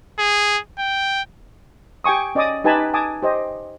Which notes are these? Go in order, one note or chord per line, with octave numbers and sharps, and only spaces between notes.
G#4
G5
G4 G5 G#5 C#6 D#6
C#4 D5 D#5 G#5 D6 D#6
D#4 G4 B4 G#5 A5 B5
G#5 A5 D6 D#6
G4 C5 D#5